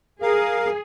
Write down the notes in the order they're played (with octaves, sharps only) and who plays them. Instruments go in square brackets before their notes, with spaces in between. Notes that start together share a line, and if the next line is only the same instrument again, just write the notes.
[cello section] G#4 [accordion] A#4 F5